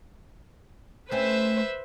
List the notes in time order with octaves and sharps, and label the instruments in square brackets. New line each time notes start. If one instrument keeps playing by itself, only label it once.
[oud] A3 C4 C#4 [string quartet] B4 C5 E5